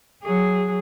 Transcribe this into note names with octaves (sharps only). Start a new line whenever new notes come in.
F#3 G#4